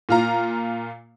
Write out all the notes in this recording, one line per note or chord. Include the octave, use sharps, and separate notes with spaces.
A#2 F4 A#5